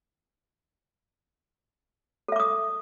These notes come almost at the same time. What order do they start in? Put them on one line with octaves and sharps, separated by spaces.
A4 E5 D6 D#6